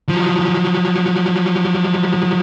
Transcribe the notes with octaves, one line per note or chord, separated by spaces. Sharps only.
F3 F#3